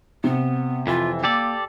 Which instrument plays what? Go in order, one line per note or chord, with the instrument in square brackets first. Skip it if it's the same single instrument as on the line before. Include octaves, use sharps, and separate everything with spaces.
[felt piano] C3 [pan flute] B3
[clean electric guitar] F2 E3 [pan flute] F4
[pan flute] A#3 [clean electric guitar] G4 A4 D5